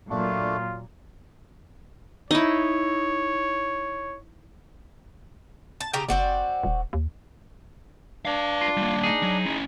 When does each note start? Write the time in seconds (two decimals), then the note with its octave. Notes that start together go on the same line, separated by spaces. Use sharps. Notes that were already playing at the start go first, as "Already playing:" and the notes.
0.10 A#2 F#3 A3 D4 F4
2.31 D#4 E4 C#5
5.80 A5
5.93 C#3 G4 A#4
6.09 F#1 C4 F#4 D5
6.63 D#1
6.93 D#2
8.25 D4 B4 F5
8.61 F4
8.77 G3 A#3
9.03 D#4 G#4
9.23 F#3
9.46 C#4 E4